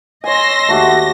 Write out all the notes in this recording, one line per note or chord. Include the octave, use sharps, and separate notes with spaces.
C#5 D#5 G#5 C6 E6 A#6
D#2 A3 F#4 G4